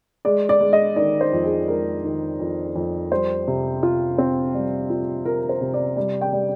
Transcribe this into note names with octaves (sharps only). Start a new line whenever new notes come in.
G#3 D5
D5
G#3
D#5
D#3 D5
C5
F2
G#4
G#3 A#4
D#3
F2
F2
G3 C5
C3
F4
C4
G3
F4
F4 A#4
C5
C3
D5
G3
G5
G3